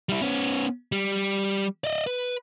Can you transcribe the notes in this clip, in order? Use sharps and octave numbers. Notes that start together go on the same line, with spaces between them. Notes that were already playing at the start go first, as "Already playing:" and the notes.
G3 E4
B3 C#4
G3
D5 D#5
B4